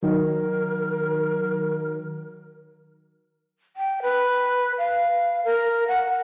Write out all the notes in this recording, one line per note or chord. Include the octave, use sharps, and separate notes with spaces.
D#3 F#3 A#4
G5
B4
F5
A#4
F#5